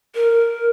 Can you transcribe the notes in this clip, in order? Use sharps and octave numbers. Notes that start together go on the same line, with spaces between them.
A#4